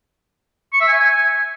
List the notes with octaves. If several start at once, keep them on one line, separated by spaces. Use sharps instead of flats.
C#6
E5
G#5